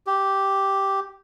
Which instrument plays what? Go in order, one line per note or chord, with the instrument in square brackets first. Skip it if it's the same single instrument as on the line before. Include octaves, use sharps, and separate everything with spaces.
[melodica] G4